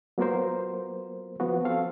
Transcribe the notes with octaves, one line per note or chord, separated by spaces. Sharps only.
F#3 A#3 B3 F4 A#4 C5
F3 B3 F#4
C4 A4 F5